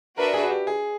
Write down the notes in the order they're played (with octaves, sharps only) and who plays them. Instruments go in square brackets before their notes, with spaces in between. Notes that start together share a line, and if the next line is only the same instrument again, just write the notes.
[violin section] D4 F#4 B4 E5 [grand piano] A#4
[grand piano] G#4
F#4
G4
G#4